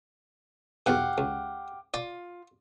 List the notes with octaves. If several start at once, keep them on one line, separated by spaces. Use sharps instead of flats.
B1 E2 G2 G4 F5 F#5
C#2
F4 D5